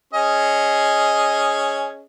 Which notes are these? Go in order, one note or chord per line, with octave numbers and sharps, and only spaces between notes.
C#4 G#4 D#5